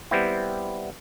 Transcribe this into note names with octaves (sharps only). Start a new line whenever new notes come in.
G3 B3 C4 E4